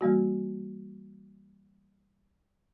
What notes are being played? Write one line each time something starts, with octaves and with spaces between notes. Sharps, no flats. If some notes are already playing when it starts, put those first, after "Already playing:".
E3 G3 A#3 F#4